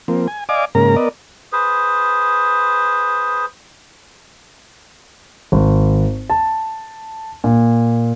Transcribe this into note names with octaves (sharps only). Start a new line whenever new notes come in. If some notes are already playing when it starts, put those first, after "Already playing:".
F3 A#3 C4
G#5
D5 D#5 F5 G#5 D6
G#2 C#3 A#3 A#4 A#5
B3 A#4 D5 D#5
G#4 B4 C5
G#1
A5
A#2